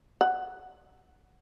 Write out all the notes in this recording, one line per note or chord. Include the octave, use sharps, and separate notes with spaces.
F#5